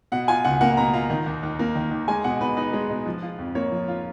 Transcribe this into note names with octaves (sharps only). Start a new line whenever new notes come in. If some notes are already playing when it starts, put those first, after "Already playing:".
B2 F#5
F4 G#5
C#2 F#5
A#3 F#5
B2 A#5
F4 A#5
D#3
D#2
D#2
A#3
D#3
D#2
G#3 G#5
B2 F#5
B2 B4
D#4 B4
G#3
B2
F3
F4
F2
A#3 C#5
F3
F4